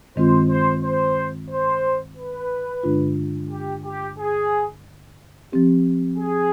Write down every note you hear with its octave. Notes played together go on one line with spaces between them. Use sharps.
G2 D#3 G#3 C4 F4 C5
C5
C5
C5
B4
G2 D3 G#3 D4 F4
G4
G4
G#4
F3 C4 G4
G#4